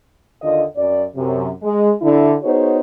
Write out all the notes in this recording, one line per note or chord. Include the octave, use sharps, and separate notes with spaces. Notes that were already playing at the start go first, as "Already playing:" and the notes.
D#2 D3 F4 D#5
F#2 D5
F#2 C3
G#3
D3 E4
B3 D#4 F#4 G#4 C5 C#5